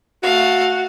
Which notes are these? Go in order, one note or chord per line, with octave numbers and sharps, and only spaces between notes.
A3 F#4 F5